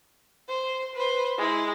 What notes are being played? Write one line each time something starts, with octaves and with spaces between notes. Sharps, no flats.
C5
B4 C5
G#3 E4